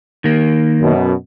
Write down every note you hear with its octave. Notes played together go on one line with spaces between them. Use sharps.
D#3 A#3
F#2 B2